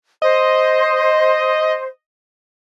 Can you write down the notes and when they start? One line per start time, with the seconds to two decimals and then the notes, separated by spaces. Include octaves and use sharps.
0.22 C5 D#5